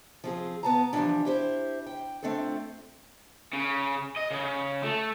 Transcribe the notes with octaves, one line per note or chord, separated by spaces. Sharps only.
F3 C4 G#4
B3 A5 A#5
E3 F3 G3 A#3 C#4 D4
E4 G4 B4 C5
G5
A3 C4 D4 F4 A4
C#3
D#5
C#3
A3